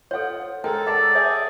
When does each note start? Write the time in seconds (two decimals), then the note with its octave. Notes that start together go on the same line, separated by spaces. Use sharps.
0.11 F4 A4 C#5 F#5
0.64 G#3 A4 A#4 G5
0.87 D5 F#5 A5 E6
1.15 G#4 C#5 E5 G#5